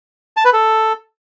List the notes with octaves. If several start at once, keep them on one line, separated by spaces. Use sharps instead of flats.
A5
B4
A4